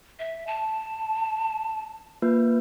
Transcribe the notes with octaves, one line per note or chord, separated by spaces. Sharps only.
E5
A5
A#3 F4 B4